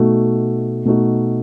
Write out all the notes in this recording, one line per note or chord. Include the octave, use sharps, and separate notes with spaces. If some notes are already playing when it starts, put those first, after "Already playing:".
Already playing: B2 A3 D#4 F#4
B2 A3 D#4 F#4